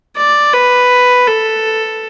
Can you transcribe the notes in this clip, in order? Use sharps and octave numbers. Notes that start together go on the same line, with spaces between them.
D5
B4
A4